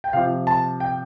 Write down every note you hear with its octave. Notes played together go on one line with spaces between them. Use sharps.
G5
C3 F3 F5
A5
G5